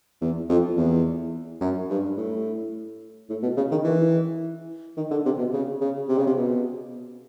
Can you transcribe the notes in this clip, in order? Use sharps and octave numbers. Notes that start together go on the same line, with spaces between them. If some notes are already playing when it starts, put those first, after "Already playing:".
E2
F2
E2
F#2
G2
A2
A2
B2
C#3
D#3
E3
D#3
D3
C3
B2
C#3
C#3
C3
C#3
C3
B2